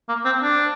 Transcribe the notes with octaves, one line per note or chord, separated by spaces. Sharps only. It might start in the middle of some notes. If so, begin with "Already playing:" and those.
A#3
C4
D4